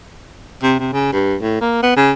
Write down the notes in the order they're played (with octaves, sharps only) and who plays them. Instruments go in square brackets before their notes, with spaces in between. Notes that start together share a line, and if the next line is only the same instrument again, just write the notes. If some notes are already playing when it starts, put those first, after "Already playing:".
[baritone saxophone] C3
C3
C#3
G2
A2
A#3
B3
C#3